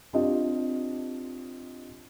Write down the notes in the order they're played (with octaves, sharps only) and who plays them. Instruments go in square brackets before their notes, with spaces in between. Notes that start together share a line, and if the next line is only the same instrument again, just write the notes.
[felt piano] C4 D4 F4 G4 D#5